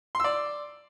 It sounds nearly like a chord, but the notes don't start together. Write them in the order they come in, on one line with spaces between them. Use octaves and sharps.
C6 E6 D5